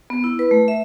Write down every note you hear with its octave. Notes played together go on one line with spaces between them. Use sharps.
B3
E4
B4
A3
E5